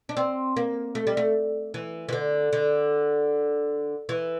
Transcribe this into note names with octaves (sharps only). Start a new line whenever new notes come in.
D4
C4
A#3
A3
G3
A3
E3
E3
D3
D3
E3